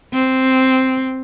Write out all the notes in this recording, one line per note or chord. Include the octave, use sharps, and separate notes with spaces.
C4